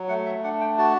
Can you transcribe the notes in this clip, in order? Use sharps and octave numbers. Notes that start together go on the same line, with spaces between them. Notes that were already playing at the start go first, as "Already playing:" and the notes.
Already playing: F#3
A3 F#5
E5
D4 F#5
G5
F#4 A5